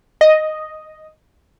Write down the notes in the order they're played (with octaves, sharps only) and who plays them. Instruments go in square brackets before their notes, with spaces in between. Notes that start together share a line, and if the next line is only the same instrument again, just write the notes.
[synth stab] D#5